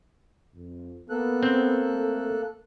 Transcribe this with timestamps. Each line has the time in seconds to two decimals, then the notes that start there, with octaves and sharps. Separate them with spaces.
0.55 F2
1.10 A#3 B3 A4 F#6
1.43 C4
1.93 A3